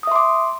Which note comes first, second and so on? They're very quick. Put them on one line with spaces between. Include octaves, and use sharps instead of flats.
D#6 E5 C6 D6